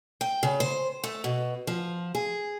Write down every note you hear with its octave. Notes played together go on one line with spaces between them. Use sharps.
G5
C#3
C5
A3
B2
F3
G#4